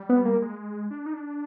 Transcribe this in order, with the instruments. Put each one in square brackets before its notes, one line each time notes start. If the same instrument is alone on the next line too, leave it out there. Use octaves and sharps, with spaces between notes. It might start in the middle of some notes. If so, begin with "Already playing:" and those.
Already playing: [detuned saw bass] G3
[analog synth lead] B3
A#3
[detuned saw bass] G#3
D4
D#4
D4